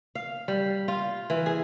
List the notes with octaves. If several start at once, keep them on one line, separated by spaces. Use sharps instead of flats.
F5
G3
F4
E3
G#4